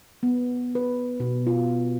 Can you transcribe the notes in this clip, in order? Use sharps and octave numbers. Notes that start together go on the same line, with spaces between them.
B3
B4
B2
F4